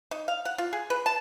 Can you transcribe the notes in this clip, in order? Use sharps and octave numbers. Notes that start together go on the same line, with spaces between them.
D#4
F5
F#5
F4
G#4
B4
A5